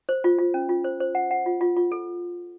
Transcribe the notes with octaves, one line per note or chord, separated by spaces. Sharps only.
C5
F4
F4
C#4
F4
C5
C5
F#5
F#5
F4
F4
F4
A4